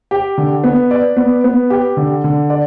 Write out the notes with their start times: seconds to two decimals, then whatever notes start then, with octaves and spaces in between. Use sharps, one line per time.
0.11 G4
0.38 D3
0.64 B3
0.91 D5
1.16 B3
1.44 B3
1.70 G4
1.97 D3
2.24 D3
2.50 D5